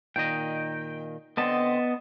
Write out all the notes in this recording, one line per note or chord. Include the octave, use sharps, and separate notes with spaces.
A#2 D#3 D#5 G5
D3 B3 C4 D#5 A5